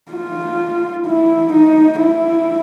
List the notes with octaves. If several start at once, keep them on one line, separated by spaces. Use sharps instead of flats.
F4
E4
D#4
E4